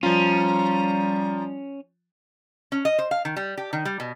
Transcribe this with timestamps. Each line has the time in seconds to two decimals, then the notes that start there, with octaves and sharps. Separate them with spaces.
0.03 F3 G3 C#4 F4 A#5
2.72 C#4
2.85 D#5
2.98 C5
3.11 F5
3.25 D#3
3.36 G3
3.57 G4
3.73 D#3
3.85 G3
4.00 B2